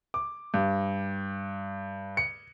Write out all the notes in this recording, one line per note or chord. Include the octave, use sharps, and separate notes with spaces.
D6
G2
C#7